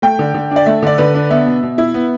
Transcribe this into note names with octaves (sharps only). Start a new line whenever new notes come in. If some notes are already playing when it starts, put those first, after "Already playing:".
A3 G5
D3
D3
D4 D5
A3 E5
D3 D5
D3 B4
D4
B3 E5
B2
B2
E4
B3